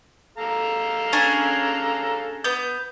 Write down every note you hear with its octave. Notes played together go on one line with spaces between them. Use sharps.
A4 F5 A#5
C#4 D4 G#4
B3 G6